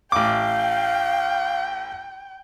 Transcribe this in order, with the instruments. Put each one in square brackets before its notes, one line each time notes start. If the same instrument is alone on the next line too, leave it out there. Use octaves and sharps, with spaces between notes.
[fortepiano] A1 D6 [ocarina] F5 [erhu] G5